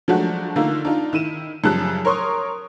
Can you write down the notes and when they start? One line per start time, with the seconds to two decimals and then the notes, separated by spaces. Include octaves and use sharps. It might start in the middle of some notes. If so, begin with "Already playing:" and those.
0.08 F3 F#3 G#3 A3 D4 F#4
0.56 D3 A3 A#3 D#4 F4
0.85 D4 D#4 F4
1.13 D#3 E4 D#7 E7
1.64 F#2 C#3 F3 G3 A5 F#6
2.05 A#4 C#5 C6 C#6 D#6